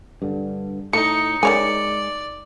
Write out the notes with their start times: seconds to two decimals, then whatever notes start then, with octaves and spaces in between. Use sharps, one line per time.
0.22 G2 D3
0.93 A2 A3 D#4 C#7
1.43 D#3 G#3 C#5 D5 G#5